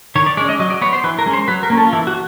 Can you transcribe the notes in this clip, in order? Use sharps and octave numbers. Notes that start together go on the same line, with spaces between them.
D#3 C#5
D5
G#3 C#4 D5
D#5
F#3 D#5
D5
B3 C#5
C5
E3 B4
A#4
G#3 C#4
C5
F#3 B4
A#4
A#3 C#4
A4
F4
E3 E4
F#4